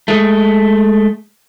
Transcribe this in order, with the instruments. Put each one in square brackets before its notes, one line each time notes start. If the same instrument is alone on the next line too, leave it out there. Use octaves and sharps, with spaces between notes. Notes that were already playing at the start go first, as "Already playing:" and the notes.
[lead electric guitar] G#3 A3